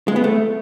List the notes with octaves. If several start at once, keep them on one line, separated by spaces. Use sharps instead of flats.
G#3
B3
A3